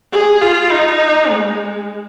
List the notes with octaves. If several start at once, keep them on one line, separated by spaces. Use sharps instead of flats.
G#4
F4
D#4
G#3